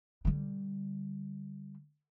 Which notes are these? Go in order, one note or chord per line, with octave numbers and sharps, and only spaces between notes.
D3 G3